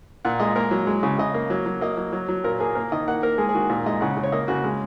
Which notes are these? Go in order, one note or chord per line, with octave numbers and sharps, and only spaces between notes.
A#2 F#5
G#3 D#5
A#3 A#4
F#3
G#3
C#3
C#3 D#5
A#3
F#3
F#3
A#3 D#5
F#3
F#3
F#3
A#2 A#4
A#3 G#4
A#3 A#4
D#3 D#5
A#3 F#5
A#3 A#4
G#3 G#4
G#4
D#3 F#4
A#2 A#4
G#3 D#5
C#3 F#5
C#3
C#5
A#3 D#5
C#3 F#4
G#3